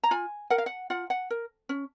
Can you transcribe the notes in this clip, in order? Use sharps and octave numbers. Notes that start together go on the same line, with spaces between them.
A#5
F4 G#5
A#4 F#5
F5
F#5
F4 F#5
F#5
A#4
C#4